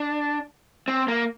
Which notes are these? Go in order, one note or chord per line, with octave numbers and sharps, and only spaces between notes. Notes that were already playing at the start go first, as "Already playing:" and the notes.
Already playing: D4
C4
A#3